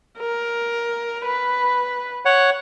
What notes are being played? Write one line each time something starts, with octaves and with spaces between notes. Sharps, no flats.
A#4
B4
C#5 F#5